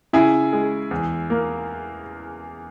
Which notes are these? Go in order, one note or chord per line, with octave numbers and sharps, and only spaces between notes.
C#3 E4 G#4
G#3
E2
A#3